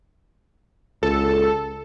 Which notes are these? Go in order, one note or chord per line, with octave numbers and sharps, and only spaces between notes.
C#2 A4